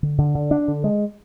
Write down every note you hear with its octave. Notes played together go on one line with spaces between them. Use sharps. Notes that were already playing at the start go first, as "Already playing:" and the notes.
D3
D3
D3
D4
D3
G#3